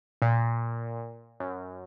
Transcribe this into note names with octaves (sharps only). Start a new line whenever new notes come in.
A#2
F#2